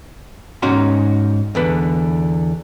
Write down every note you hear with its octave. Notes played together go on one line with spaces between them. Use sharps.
G#2 C#4 D#4 F#4 C6
E2 D3 B4